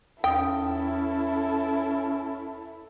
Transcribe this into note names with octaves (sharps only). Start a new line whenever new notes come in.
E2 C#4 E4 A4 G5 D#6